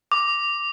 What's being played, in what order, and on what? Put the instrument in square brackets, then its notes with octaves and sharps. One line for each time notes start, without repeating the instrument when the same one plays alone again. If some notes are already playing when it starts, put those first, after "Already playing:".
[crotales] D6